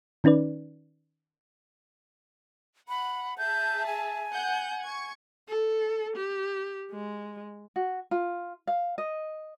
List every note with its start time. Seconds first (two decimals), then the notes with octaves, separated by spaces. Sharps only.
0.24 D#3 C#4 D#4 B4 D5
2.89 F#5 B5
3.38 G#4 E5 A5 G6
3.86 G#5
4.32 F#5 G6
4.81 C#6 G#6
5.48 A4
6.16 G4
6.91 G#3
7.76 F#4
8.11 F4
8.67 F5
8.98 D#5